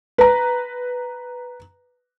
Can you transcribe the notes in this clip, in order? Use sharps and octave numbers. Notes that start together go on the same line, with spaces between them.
B4 A#5